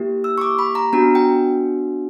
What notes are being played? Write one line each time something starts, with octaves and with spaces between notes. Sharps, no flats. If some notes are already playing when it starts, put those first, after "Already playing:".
Already playing: A#3 E4 G4
E6
C#6
D6
B5
A#5
B3 D4 F#4 A#5
G5